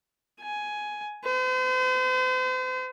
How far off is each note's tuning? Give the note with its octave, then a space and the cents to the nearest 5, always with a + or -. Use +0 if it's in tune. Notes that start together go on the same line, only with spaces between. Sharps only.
G#5 +10
C5 -40